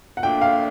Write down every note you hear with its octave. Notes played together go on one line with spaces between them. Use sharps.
F#5
A#2 F3 A3 D4 G5
F5